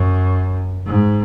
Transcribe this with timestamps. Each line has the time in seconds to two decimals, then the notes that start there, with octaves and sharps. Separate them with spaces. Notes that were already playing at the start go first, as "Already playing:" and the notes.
Already playing: F#2
0.86 G#2